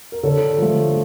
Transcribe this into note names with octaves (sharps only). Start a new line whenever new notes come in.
A#4
D3 A4 C#5
F3 A3